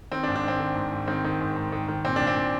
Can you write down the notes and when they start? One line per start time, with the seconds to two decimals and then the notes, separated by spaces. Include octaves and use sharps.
0.12 D#3 C4
0.23 D4
0.28 G#2
0.35 D4
0.43 D#3 C4
0.60 D#3
0.75 G#2
0.92 G#2
1.07 D#3 C4
1.24 D#3
1.40 G#2
1.56 G#2
1.72 D#3
1.88 D#3
2.05 A#2 C4
2.16 A#2 D4
2.27 C4
2.36 A#2